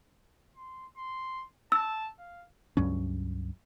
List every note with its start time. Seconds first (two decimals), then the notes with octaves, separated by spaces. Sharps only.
0.56 C6
0.97 C6
1.72 A5 E6
2.19 F5
2.77 C#2 G2 F#3 C#4